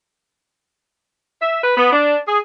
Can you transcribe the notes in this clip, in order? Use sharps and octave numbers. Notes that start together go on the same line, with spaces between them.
E5
B4
B3
D4
G#4